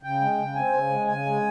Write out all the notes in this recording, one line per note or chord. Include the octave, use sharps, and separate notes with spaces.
C#3 G5
G#3
C#3
C4 G#5
C#3
G#3
C#3 G#5
G#3